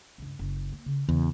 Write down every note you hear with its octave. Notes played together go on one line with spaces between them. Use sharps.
C#2 G2
F#1
A#3
C#3
E2 C#3